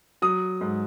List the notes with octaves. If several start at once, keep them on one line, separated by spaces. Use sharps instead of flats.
F#3 D#6
G#2